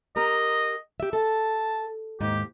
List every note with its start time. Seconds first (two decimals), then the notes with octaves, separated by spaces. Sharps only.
0.16 G4 A#4 D#5 A#5
1.00 G4 E5
1.13 A4 A5
2.21 D#2 G#2 G4